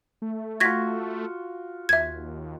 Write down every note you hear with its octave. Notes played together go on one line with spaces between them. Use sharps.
A3
F4 F#4 G#6 A#6 B6
D#2 E5 G#6